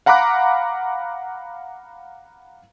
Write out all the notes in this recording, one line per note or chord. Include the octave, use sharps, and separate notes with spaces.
F5 F#5 A#5 B5 D6 F#6